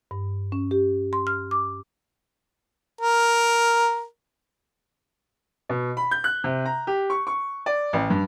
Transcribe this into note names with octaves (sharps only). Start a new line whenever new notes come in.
G2
C#4
G4
C6
F6
D6
A#4
B2
B5
G6
F#6
C3
A#5
G4
C#6
C#6
D5
A1
G2